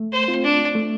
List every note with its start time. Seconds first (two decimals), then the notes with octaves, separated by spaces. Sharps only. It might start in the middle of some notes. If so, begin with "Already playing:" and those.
Already playing: A3
0.12 C5
0.28 C4 F4
0.44 D4
0.75 A3